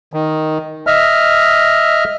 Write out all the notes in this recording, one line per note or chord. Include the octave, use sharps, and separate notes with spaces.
D#3
D#5 E5 F6